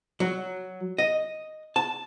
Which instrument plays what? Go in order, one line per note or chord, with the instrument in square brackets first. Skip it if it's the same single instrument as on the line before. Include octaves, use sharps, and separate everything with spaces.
[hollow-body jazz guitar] F#3
D#5
A5